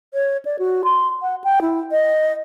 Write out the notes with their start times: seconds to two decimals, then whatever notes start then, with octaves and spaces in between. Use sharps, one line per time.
0.14 C#5
0.45 D5
0.59 F#4
0.84 C6
1.22 F#5
1.44 G5
1.62 E4
1.92 D#5